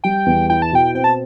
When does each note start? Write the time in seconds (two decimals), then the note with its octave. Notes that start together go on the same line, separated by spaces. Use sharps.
0.04 G3 G5
0.26 E2
0.50 E4 G5
0.62 A5
0.72 B2 G5
0.95 C4 G5
1.04 A5